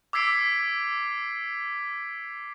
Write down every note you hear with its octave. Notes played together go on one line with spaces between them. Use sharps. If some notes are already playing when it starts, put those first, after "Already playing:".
D6 E6 G#6 B6 C7 D7